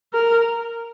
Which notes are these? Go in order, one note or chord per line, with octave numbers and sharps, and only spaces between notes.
A#4